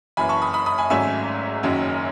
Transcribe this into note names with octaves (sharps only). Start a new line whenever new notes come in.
F#1 F#2 E3 G#5 B5
A5 C#6
B5 D#6
B5 D#6
B5 D#6
G#5 B5
G#1 G#2 F#3 A3 C#4 E5 G#5
F#1 F#2 D#3 F#3 C#4